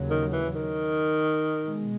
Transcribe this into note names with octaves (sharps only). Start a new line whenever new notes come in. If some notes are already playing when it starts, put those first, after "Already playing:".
Already playing: D#2 C#3 F#3
D#3
E3
D#3
B2 G#3